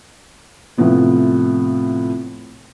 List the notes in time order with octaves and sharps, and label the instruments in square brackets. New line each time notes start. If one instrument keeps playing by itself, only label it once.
[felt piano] A2 C3 F3 B3 E4